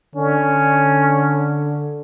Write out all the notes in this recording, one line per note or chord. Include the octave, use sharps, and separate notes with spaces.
D3 C#4